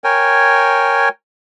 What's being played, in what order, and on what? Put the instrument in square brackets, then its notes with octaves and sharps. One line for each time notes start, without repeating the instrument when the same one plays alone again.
[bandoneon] A#4 C#5 G5 G#5